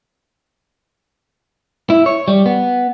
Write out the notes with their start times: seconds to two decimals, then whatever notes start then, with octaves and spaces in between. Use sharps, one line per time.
1.90 E4
2.06 C#5
2.28 G3
2.46 B3